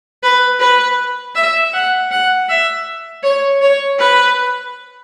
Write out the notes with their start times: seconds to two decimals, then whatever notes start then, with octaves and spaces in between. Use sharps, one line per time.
0.23 B4
0.60 B4
1.35 E5
1.74 F#5
2.11 F#5
2.49 E5
3.23 C#5
3.62 C#5
3.99 B4